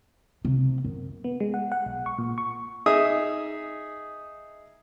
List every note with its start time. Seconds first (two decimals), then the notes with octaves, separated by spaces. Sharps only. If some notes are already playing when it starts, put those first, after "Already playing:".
0.45 C3
0.84 F#2
1.24 B3
1.40 G#3
1.54 F#5
1.72 F#5
1.86 B1
2.06 C#6
2.18 A#2
2.38 C#6
2.86 D#4 G#4 E5 D#6